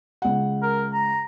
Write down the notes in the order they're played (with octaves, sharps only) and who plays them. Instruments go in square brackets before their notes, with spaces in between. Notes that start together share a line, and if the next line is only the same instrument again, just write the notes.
[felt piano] C#2 F#5
[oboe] A#4
A#5